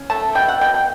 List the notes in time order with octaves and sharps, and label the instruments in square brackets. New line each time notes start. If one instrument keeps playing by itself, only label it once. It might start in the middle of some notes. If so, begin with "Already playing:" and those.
Already playing: [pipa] C#4
A3 A5
B2 G5
F#5
B2 G5
G5